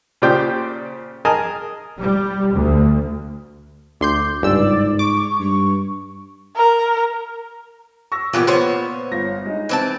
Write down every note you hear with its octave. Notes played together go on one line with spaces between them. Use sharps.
A#2 C#3 G4 C5 D5 G5
G#4 A#4 D#5 G#5 A5
G3
D2
D2 C6 D6 G6
G1 C#2 G#2 D5 E6
C#6 D6
G2 C#6
A#4
C#6 E6 A#6
A#2 E3 B3 G4
B3 C5 C#5
G1 A#6
G#3 D#4
E3 C4 A5